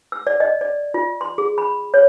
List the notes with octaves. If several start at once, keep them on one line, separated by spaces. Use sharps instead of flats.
E6
D5
D#5
D5
F4
C6
G#4
B5
C#5